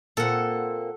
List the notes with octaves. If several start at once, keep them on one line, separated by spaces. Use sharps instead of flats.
A#2 A#3 C4 A4 F#5